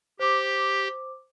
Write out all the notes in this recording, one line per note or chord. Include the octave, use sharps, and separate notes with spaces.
G4 C5 D6